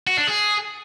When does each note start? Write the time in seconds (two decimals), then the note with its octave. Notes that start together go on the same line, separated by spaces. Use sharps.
0.07 F#4
0.17 D4
0.27 G#4